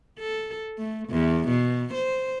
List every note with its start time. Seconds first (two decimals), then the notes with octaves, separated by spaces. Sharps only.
0.19 A4
0.78 A3
1.09 E2
1.49 B2
1.94 C5